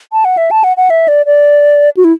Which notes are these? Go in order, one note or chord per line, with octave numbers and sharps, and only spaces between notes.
A5
F#5
E5
A5
F#5
F#5
E5
D5
D5
F#4
E4